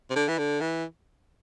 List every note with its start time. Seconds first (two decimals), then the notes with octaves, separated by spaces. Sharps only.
0.10 C3
0.16 D3
0.28 E3
0.38 D3
0.61 E3